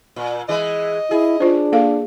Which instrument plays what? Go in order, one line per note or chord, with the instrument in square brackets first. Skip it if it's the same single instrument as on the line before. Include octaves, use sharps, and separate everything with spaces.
[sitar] A#2
[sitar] E3 G#3 [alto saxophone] D#5
[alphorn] E4 [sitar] G#4
[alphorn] D4 [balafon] F4 C5
[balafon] A#3 A4 F5